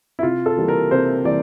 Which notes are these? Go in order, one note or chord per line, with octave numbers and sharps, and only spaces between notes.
E4
C3 F4
A4
E3 G3 A#3
A#4
C3 C5
E3 G3 A#3 D5